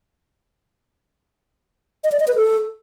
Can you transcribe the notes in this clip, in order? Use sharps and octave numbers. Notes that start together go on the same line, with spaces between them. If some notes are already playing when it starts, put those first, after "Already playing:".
D#5
D5
D#5
B4
A4